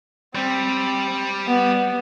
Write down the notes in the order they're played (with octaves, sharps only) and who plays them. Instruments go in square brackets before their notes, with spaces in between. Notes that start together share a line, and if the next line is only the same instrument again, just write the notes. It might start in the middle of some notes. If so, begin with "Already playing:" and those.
[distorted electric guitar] G3 [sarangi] C4
[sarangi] B3